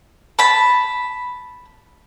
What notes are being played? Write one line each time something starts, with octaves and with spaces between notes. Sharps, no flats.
A5 B5